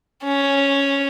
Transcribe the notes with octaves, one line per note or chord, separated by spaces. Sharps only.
C#4